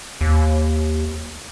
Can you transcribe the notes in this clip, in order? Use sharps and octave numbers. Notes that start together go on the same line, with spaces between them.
D#2